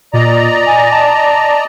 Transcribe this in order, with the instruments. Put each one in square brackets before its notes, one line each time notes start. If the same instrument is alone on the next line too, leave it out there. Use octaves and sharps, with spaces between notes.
[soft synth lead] A#2 [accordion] D5 D#5 A#5
[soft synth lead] G#5
A5